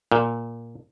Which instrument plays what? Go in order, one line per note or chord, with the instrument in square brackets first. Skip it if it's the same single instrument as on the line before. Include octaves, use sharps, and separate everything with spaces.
[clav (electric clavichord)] A#2